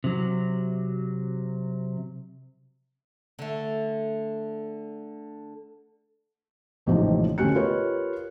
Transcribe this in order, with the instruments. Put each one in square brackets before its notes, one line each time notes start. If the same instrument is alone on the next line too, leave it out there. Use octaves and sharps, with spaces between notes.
[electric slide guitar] C3 F#3
[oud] D3 A3
[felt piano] D#1 A1 G#2 C3 F3 D#4
D2 A3 C#4 G4 F#6 C#7
F4 G4 A#4 B4 C#5 D#5